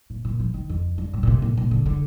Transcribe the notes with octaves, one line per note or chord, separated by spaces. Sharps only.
A#2
A#2
F3
D#3
F2
G2
A2
A#2
C3
A#2
A#2
D3
D3